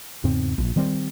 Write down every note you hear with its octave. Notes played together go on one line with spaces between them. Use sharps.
E2 G#2 C#3 C4
A#1
D#3 G3 C4